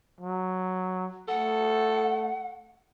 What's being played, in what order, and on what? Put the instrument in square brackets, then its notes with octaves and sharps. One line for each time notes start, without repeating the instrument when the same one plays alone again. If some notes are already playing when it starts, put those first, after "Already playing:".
[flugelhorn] F#3
[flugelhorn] A3 [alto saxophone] A4 [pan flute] F#5